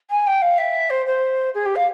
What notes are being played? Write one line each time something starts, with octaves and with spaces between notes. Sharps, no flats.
G#5
G5
F5
E5
C5
C5
G#4
G4
F5